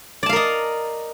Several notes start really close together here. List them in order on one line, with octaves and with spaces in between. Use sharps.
D5 A5 F5 A#4 D#5